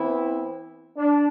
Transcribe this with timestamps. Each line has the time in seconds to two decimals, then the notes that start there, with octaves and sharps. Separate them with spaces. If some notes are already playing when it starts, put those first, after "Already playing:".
Already playing: E3 B3 C4 E4
0.97 D4